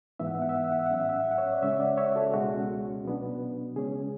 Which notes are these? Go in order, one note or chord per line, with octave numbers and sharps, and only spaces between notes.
G#2 E3 B3 E5
F#5
E5
F#5
E5
F#5
E5
F#5
E5
F#5
A2 F#3 C#4 E5
F#5
E5
F#5
E5
F#5
C#5 E5
D5
C#3 G#3 C#4 C#5 E5
D5 F#5
C#5 E5
F#4 A4
C#2 B2 G#3 C#4 F#4
B2 F#3 B3 D4
D2 C#3 G#3 C#4 G#4